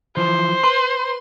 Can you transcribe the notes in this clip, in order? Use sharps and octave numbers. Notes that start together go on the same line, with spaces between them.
E3 F3 C5
B4 C6